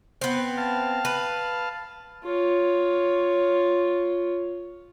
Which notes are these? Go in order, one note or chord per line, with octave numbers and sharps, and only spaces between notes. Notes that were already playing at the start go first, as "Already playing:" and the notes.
B3 C4
F5 A5
B4
F4 C#5